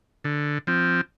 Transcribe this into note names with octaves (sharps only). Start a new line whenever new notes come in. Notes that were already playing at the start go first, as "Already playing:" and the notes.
D3
F3 C4